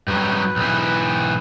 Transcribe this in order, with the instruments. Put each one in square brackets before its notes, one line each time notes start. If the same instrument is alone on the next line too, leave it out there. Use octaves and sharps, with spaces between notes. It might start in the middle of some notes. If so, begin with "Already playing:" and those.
[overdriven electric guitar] G2 F#3 [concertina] B4
[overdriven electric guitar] B1 E3